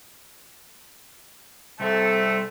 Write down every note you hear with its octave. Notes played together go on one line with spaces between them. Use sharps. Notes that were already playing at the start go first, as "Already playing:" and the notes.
C2 A3 C4 A4 E5